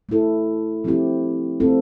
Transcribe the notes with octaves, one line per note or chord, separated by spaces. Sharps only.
A3 E4 A4
F3 C4 E4 G4
A3 C4 F4 A4